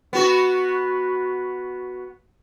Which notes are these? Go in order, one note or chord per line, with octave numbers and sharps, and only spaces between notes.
B3 F#4